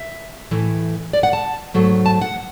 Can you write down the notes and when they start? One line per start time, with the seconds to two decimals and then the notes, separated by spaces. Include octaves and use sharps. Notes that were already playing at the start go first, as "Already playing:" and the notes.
Already playing: E5
0.51 A2 E3 A3
1.13 D5
1.23 F#5
1.33 A5
1.74 G#2 F#3 A3
2.06 A5
2.21 F#5